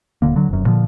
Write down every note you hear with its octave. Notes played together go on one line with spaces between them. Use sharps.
D#1 D3 A#3
D3 F#3
F1 F#2
A#2 D3 F3